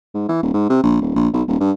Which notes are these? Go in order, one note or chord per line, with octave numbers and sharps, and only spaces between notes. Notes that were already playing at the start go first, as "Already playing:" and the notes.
G#2
E3
D#1
G#2
C3
A#1
D#1
A#1
B1
D#1
G2